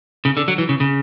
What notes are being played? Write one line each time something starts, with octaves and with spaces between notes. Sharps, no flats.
C#3
D3
F#3
E3
C#3
C#3